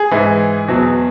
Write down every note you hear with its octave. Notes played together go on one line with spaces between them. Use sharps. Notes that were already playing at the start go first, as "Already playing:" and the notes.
Already playing: G#4
G#2 E3
E2 B2 F#3